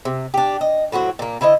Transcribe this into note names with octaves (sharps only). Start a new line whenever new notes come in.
C3
D4 G4
D#5
A2 F#3 C4 F#4
A#2 A#3
D3 E4 C5 D#5